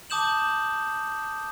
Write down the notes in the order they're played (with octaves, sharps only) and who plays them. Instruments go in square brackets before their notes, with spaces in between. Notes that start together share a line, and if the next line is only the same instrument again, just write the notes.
[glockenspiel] A5 D6 D#6 G6 E7 F#7